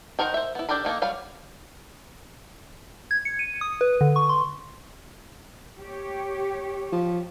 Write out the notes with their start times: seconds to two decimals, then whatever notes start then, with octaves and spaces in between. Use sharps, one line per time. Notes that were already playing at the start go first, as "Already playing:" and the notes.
0.19 D#3 A#4 C5 F#5 A#5
0.34 C5 E5
0.55 B3 E4
0.69 D4 G4 A4 A#4 B5
0.85 D#3 A#3 D#4 A4
1.02 F#3 G3 F5 B5
3.11 G#6
3.25 C#7
3.39 D#7
3.61 D#6
3.81 B4
4.01 D3
4.16 C#6
4.29 C6
5.80 G4 C#5
6.92 F3